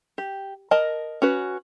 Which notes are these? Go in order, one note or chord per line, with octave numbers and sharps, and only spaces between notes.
G4
A#4 D#5 A5
C#4 F#4 B4